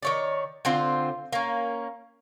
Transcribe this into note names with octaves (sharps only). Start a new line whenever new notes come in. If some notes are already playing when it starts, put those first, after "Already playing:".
D#3 C#5 D5
D3 C4 F4 C5
A#3 C#4